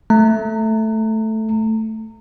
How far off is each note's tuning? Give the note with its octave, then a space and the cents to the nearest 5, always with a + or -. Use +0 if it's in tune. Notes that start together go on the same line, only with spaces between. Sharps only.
A3 +0 A#5 -30